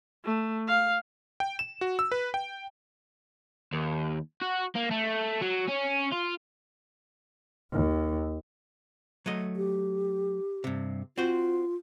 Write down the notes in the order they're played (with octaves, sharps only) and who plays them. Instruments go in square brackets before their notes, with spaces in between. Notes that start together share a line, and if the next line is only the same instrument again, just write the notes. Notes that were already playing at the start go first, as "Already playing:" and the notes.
[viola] A3
F5
[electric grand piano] G5
E7
F#4
E6
B4
G5
[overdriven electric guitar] D#2
F#4
A#3
A3
F#3
C#4
F4
[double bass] D#2
[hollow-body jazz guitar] F#3 A3 D#5
[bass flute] G4
[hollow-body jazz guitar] G2 C3
[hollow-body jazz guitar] C4 F#4 C5 [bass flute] F4